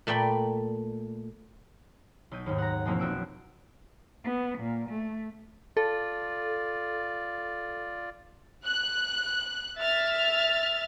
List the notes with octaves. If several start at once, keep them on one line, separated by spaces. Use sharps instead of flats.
A#2 A3 D5 G5 B5
B1 G6 D#7
D#2 G#2
F#5 A#5
B2 E3 F3 G#3 A#3 C4
F1 B1 F#4 E6 F#6 D7
B3
A#2
A3
F4 A4 D5
F#6
E5 F6 A6